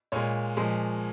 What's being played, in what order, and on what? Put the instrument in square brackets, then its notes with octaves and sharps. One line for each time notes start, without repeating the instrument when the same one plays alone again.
[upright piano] A#2 G#3 C#5
A#2 F3 G#3